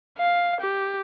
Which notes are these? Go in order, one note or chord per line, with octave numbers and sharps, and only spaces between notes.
F5
G4